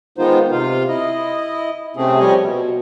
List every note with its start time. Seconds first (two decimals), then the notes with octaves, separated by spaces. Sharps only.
0.18 D#3 G#3 B3 D#4 F4 C5
0.51 C3 F4 F5
0.89 E4 D#5
1.96 C3 A3 C4 C#4 G#4
2.19 F3 G3 G4 C#5 D#5 G#5
2.41 B2